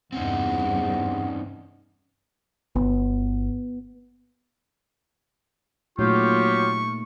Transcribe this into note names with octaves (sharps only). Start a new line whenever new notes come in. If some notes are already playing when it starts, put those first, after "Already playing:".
E2 G2 C3 C4 C#4 D#4 F#5
G1 B3
A#2 F#3 A3 D#4 F4 G4 C#6